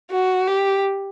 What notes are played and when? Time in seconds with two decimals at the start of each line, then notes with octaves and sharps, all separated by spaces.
0.10 F#4
0.47 G4